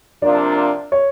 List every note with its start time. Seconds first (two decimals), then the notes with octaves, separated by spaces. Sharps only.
0.22 C3 F3 A#3 D4 D5
0.92 C#5